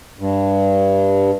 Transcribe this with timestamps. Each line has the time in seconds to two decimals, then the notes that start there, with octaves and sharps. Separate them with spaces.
0.19 G2